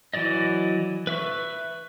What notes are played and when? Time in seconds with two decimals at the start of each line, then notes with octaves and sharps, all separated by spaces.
0.14 E3 F#3 D5 D#5
1.07 B4 E5 C#6